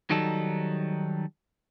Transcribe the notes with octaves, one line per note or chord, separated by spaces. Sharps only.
D#3 F#3 G3 D#4 A4